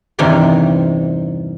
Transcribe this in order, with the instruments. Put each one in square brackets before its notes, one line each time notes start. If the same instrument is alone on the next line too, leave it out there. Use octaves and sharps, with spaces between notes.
[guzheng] E2 G2 C3 D#3 C6